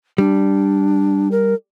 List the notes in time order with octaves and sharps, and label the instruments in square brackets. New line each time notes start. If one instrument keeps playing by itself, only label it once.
[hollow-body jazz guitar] G3 [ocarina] D4
[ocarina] A#4